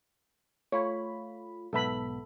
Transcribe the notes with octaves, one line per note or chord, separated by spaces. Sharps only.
A3 F4 C#5 B5
B1 G#2 B3 A4 E5 B5